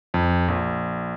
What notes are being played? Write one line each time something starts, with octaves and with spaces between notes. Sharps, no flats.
F2
A#1